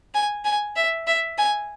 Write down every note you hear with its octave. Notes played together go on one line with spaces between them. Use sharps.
G#5
G#5
E5
E5
G#5